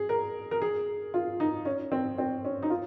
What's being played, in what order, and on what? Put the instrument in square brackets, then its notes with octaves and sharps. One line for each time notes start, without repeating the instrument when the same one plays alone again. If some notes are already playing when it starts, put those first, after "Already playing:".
Already playing: [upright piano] G#4
A#4
A#4
G#4
F4
D#4
C#4
C4
C4
C#4
D#4
F4